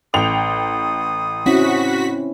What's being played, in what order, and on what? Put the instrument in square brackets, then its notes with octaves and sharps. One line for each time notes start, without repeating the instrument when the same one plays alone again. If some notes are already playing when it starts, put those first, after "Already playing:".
[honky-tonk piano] A1 G5 F7 [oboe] D#6
[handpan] C4 C#4 E4 [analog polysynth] F#4 B6